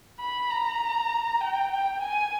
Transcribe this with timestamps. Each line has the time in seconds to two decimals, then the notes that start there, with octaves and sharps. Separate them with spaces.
0.20 B5
0.51 A#5
1.41 G5
1.71 G5
2.02 G#5